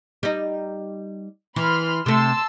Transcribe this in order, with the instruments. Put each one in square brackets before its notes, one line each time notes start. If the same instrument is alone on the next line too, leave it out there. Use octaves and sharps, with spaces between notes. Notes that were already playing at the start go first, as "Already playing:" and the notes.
[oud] G3 D#4
[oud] E3 [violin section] B5 C6 F6
[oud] C3 A3 [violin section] A5 C6 E6